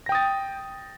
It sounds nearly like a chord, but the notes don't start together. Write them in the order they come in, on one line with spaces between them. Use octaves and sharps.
A#6 G5 D#6 A6